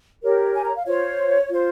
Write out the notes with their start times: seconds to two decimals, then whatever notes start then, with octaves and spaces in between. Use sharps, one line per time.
0.22 G4 A#4 C#5
0.54 G#5
0.65 A#5
0.76 F5
0.85 F4 C5 C#5
1.49 F4 C5